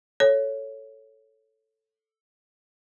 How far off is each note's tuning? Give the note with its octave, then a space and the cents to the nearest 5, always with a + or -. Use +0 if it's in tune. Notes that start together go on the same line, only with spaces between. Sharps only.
A4 +0 C#5 +0